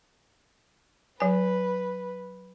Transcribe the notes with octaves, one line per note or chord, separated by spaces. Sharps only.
F#3 B4 G#5